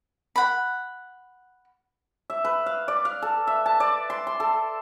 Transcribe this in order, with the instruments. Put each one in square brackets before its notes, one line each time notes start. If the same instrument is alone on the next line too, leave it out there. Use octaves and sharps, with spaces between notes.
[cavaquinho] F#5 B5
[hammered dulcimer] E5
B4
F5
D5
F5
A4
E5
A5
D5
C6
C6
A4